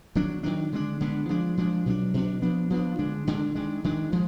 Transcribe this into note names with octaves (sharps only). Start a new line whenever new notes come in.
D#3 F#3 D4
D#3 F#3 D4
D3 G#3 B3 D4
D3 G#3 B3 D4
F3 G#3 D4
F3 G#3 D4
B2 F#3 D4
B2 F#3 D4
F3 B3 D4
F3 B3 D4
D3 G#3 D4
D3 G#3 D4
D#3 G#3 D4
D#3 G#3 D4
F3 G#3